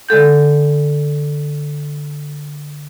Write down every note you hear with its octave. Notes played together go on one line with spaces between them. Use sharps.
D3 G#3 A4 G6